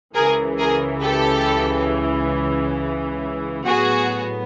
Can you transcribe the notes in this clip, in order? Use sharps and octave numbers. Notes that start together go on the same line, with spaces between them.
C#2 C#3 E3 G#4 A#4
G#4 A#4
G4 A4
A2 F#3 B3 F#4 G#4